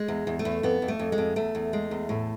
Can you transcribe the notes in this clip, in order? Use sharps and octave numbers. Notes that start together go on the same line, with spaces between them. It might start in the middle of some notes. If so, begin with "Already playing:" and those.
Already playing: G#3
E2
E2
A3
E2
F2 B3
F2
A3
F2
G#3
F2
E2 A3
E2
G#3
E2
A2